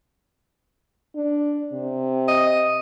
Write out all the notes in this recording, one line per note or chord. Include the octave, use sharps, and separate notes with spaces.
D4
C3
D#5